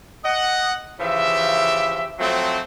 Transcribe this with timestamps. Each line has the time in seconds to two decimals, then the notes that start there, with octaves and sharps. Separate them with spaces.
0.24 D#5 F#5
1.00 C#3 E3 F3 G4 E5
2.19 F3 F#3 A3 C4